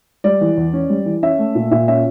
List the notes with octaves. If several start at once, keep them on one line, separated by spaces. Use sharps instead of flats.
G3 D5
E3
E2
C#4
G3
E3
C#4 E5
A3
A#2
A#2 E5
C#4 E5